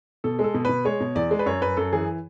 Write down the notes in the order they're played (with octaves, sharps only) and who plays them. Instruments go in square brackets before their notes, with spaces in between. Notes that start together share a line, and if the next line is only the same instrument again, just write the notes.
[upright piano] B2 A4
G#3 A4
B2
B2 B4
G#3 C#5
B2
E2 D5
G#3
B4
F#2 C#5
F#2 B4
F#2 A4
E3 G#4